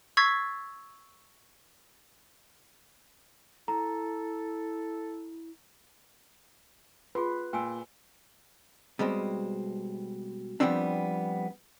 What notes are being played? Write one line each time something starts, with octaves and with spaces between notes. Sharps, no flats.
C#6 E6 G#6 A6 B6 C7
E4 A4 A#5
F4 G#4 B4 C6
A#2 G5 G#5 E6
B2 G3 G#3 C4
F3 G3 A3 B3 C4 D4